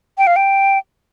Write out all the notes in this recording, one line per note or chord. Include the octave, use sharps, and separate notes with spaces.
G5
F5
G5